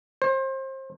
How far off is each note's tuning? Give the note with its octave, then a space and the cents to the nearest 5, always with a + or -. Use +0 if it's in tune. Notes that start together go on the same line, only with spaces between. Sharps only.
C5 +30